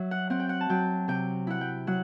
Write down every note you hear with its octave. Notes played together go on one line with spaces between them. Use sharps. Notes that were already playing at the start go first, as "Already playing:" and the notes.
Already playing: F#3 E5
F#5
C4 F#5
G5
F#5
A5
F#3 G5
C3 G5
E4 F#5
G5
F#3 F#5